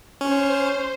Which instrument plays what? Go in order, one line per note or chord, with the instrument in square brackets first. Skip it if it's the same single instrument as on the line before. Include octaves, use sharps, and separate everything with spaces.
[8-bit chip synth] C#4 [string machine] C5